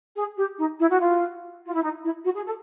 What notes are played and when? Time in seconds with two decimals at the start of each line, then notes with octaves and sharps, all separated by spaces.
0.16 G#4
0.37 G4
0.58 D#4
0.79 E4
0.90 F#4
1.00 F4
1.67 F4
1.75 E4
1.83 D#4
2.03 E4
2.25 F#4
2.35 G#4
2.46 A4